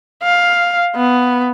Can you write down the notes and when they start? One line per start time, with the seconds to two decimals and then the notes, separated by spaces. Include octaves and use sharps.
0.23 F5
0.96 B3